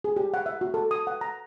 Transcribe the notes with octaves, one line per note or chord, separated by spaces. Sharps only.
G#4
G4
F#5
E5
F#4
A4
D#6
F#5
A#5